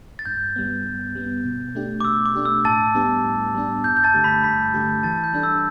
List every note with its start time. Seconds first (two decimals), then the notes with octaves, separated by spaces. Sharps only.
0.19 A6
0.25 G2 G6
0.56 G3 B3
0.85 G2
1.15 G3 B3
1.45 B2
1.75 A3 D4 G4
2.01 D6
2.05 B2 E6
2.26 D6
2.35 A3 D4 G4
2.46 E6
2.65 A2 A5 A6
2.95 G3 B3 D4 G4
3.25 A2
3.55 G3 B3 D4 G4
3.84 G2 G6
3.97 G6
4.04 A5 A6
4.14 D3 A3 G4
4.24 B5 B6
4.44 G2 B5 B6
4.74 D3 A3 G4
5.03 E3 A5 A6
5.24 G6
5.33 G3 D4 A4
5.43 E6